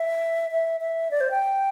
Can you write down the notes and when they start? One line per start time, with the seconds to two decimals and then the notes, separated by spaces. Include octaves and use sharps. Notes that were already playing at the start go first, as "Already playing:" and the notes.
Already playing: E5
0.51 E5
0.81 E5
1.11 D5
1.21 C5
1.31 G5